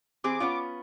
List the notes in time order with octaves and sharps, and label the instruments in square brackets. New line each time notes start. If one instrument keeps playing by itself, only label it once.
[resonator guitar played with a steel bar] E3 C4 G#4 [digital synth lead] D6
[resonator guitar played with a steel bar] B3 C#4 F4